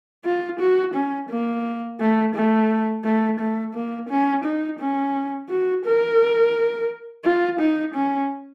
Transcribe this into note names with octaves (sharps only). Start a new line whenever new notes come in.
F4
F#4
C#4
A#3
A3
A3
A3
A3
A#3
C#4
D#4
C#4
F#4
A#4
F4
D#4
C#4